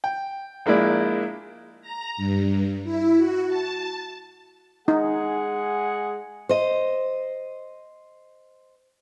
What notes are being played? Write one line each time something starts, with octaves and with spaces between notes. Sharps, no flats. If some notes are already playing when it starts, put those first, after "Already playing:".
G5
A#1 G#3 A#3 E4 D5
A#5
G2
E4
F#4
A5
G#3 D#4 G#4 F#5
C5 D#5